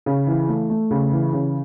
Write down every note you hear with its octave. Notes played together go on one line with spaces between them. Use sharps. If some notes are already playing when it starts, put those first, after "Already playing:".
C#3
E3
A3
A3
C#3
E3
C#3